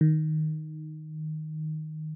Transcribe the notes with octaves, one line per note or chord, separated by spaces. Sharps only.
D#3